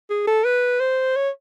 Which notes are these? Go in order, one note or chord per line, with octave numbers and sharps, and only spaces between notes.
G#4
A4
B4
C5
C#5